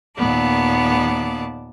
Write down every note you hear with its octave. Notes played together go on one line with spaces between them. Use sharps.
D#2 A#2 D#3 B3 D5 A5